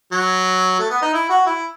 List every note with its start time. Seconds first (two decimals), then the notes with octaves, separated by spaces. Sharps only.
0.12 F#3
0.79 A3
0.90 B3
1.02 D#4
1.13 E4
1.29 F#4
1.46 E4